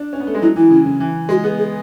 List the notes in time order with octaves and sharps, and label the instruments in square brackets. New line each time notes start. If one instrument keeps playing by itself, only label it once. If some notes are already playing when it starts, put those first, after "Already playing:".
Already playing: [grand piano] D4
C#4
B3
A3
G#3
[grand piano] F#3 [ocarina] E4
[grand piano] E3 [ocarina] E4
[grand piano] C#3
C#3
E3
[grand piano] G#3 [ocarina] F#4
[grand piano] B3 [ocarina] G#4
[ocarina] G#4